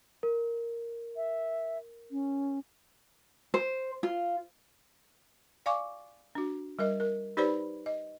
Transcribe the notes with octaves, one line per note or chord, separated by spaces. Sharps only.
A#4
E5
C#4
C5
F4
D5 F5 G#5 C#6 D6
D4 F#4
G3 A#4 D#5
A#4
D#4 G4 B4 C5 D5 B5
D#5